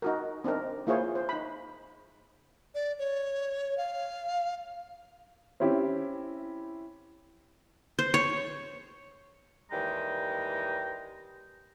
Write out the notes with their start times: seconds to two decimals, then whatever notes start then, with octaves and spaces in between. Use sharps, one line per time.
0.02 D#4 F#4 A#4
0.44 C4 D4 D#4 A#4
0.87 A#3 E4 F4 G#4 C5 C#5
1.15 C5
1.29 D#4 B5
2.75 D5
2.99 C#5
3.78 F5
5.60 C4 C#4 E4 G4
7.99 C5
8.14 C#5
9.71 D#2 E3 G3 G#3 G5 A#5